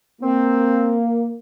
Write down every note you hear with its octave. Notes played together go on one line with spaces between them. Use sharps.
A#3 C4